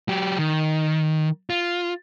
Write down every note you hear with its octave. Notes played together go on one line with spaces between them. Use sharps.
F#3 G4
D#3
F4